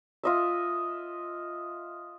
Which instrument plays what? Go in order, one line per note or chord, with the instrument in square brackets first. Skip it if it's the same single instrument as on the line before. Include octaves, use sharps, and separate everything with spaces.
[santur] F4 D#5 E5